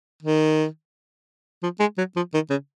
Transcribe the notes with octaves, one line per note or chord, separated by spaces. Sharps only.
D#3
F3
G#3
F#3
F3
D#3
C#3